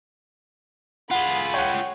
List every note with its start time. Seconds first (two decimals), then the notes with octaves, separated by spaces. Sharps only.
1.11 F4 G#4 F#5 B5
1.54 C#5 F#5 G5